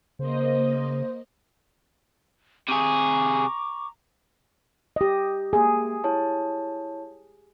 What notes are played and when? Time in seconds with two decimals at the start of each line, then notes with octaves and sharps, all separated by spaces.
0.19 C#3 A#3 C5 D#5
2.69 C3 G#4 A#5 C#6 D6
4.96 G4 D#5
5.53 A#3 G#4 G#5
6.04 E4 C#5 A5